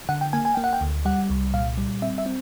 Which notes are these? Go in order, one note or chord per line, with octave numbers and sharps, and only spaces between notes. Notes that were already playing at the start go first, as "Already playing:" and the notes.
D3 F#5
G5
A#3 G#5
G#5
A#3 G5
F#5
G5
D2
G3 F#5
C2
A#2 F5
G3
C4 E5
E5
C4